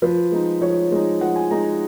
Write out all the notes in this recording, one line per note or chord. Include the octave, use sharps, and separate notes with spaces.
F3 B4
G#3 D#4
F3 C#5
G#3 D#4
F3 F#5
G#5
G#3 D#4 A#5